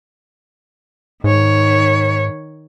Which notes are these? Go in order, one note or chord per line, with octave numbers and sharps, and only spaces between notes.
G#2 D#3 C#5